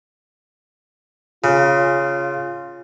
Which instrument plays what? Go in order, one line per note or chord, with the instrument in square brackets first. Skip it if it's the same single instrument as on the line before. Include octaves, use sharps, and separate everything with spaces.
[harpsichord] C#3 [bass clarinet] F4